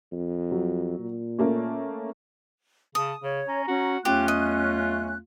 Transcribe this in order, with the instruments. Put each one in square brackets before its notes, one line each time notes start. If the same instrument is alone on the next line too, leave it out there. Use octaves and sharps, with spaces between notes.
[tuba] F2
[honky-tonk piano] F#3
[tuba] A#2
[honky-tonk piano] A3 A#3 C#4
[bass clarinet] C#3 [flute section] A5 [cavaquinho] D#6
[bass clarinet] C#3 [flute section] C#5
[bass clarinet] C#4 [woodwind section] A#5
[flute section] C#4 [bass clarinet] F#4
[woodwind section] E2 F#3 A3 [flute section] C#4 F#6 [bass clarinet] F4 [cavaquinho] G4
[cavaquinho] D#5